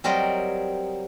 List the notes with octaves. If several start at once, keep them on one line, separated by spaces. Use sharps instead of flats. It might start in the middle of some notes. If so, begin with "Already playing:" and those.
F#3 G3 C4 A#4 D#5